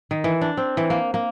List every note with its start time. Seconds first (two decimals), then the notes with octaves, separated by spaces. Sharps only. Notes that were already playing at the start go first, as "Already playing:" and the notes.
0.11 D#3
0.24 E3
0.41 D4
0.57 C4
0.77 E3
0.90 A#3
1.14 A#3